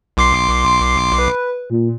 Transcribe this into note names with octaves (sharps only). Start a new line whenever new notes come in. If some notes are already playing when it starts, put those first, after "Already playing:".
B1 C6 D6 C7
B4
A#2